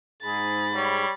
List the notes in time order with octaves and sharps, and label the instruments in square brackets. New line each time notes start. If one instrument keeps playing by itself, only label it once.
[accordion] G#2 [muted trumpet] G#4 [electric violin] B5 A6
[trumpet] G3 [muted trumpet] C#5